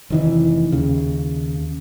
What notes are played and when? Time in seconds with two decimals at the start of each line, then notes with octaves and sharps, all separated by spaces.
0.10 F1 D#3 E3
0.72 D#2 C#3